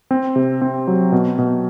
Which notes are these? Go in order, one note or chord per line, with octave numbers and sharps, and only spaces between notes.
C4
C3
C4
F#3
B2
B2